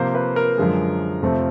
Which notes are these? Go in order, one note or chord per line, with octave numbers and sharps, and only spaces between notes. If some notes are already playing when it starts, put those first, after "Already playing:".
Already playing: C3 F3 A#3 C5
B4
A#4
F#2 D3 F3 G#3
F2 C3 F3 A3 C4